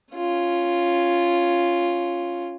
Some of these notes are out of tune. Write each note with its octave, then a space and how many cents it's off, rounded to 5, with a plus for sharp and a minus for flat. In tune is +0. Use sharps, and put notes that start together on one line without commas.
C#4 +0 F4 -5